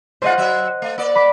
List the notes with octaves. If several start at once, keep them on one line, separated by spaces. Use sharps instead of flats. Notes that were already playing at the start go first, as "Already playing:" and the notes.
G#3 F4 C5 D#5 F#5
F#3 E5
A3
A#3 D5
B5 D6 B6